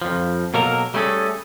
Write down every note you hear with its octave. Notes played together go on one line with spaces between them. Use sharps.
F2 F3
B2 F#3 A#3 A4 A#4
G3 A3 B3 C#4 G#4 A4